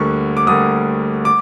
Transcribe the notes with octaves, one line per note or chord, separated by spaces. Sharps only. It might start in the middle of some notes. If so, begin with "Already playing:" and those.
Already playing: D2 D3 G3 A#3 C#6
D6
D2 D3 G3 A#3 D#6
D6